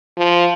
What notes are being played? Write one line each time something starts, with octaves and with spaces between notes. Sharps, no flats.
F3